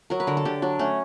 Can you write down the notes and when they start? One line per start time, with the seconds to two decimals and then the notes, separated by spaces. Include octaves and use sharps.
0.10 F#3 A#4
0.20 B4
0.27 D3 A#4
0.37 A4
0.45 D3 G4
0.62 F#3 D4
0.79 A3 C#4